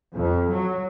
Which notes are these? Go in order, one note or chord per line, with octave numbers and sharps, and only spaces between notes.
F2
F#3